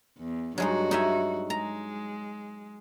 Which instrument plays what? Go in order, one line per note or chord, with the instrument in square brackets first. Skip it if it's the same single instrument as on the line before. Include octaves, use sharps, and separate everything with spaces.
[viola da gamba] E2
[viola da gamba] G2 F#4 [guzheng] F#3 G#3 D#4
[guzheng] D#4 E5 G#5
[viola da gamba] G#3 [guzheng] A#5